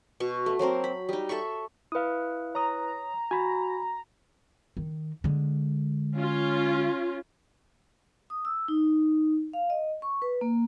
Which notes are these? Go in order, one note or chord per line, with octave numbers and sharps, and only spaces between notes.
B2 C#6
A3
F#3 A#3 C4 A#4
B5
G3 D#4
A4 E5 B5 C#6
E4 B4 F5 D#6
C#5 A#5 D#6
F#4 G#5 B5
D#3
D3 G#3
C#4 F4
D#6
E6
D#4
F5
D#5
C#6
B4
A#3